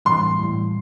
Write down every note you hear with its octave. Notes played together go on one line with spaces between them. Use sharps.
A2 E3 G3 C6
A2 E3 G3